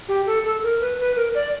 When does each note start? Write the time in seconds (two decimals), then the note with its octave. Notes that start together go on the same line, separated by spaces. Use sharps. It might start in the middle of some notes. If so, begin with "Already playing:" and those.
0.09 G4
0.27 A4
0.45 A4
0.63 A#4
0.81 B4
0.99 B4
1.16 A#4
1.35 D5